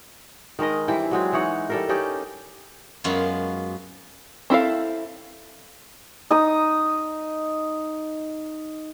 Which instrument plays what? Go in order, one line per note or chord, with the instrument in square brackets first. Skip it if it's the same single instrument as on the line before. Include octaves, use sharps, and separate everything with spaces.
[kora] D#3 G#3 A#4 D#5
E3 G3 C4 E4
F#3 G#3 C4
E3 D#4 C#5 F#5
G3 A4 A#4
C#4 D#4 G4 D5
[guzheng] F#2 G#3 B3 F4
[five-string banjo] C4 E4 A4 F5
[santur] D#4 A#5 D#6